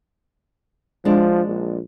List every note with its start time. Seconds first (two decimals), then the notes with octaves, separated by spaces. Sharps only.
1.05 F3 G#3 D4
1.47 A#1